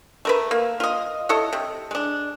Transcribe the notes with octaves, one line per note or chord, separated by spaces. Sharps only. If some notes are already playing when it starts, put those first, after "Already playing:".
A3 A#4 B4
A#3
F4 D#5
E4 A4 C#5 D#5
C3
G#3 D4